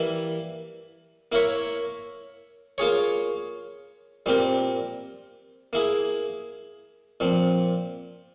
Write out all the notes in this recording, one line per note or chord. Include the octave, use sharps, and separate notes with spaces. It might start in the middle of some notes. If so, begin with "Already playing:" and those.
Already playing: E3 G3 A#3 E4
A#3 E4 A#4 C#5 E5
A#3 F4 G#4 C#5
A#2 G3 C4 G4 A#4
A#3 E4 G#4
A#2 F3 C4